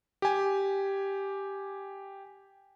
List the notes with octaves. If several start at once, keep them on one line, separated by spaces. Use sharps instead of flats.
G4 G#5